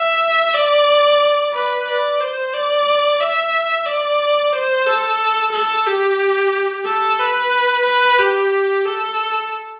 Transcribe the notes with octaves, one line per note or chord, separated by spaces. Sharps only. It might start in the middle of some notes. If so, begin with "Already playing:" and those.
Already playing: E5
D5
B4
D5
C5
D5
E5
D5
C5
A4
A4
G4
A4
B4
B4
G4
A4